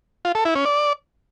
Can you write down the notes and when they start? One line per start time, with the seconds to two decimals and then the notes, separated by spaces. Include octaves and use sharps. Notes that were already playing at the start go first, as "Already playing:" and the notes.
0.25 F4
0.35 A4
0.45 E4
0.55 C#4
0.66 D5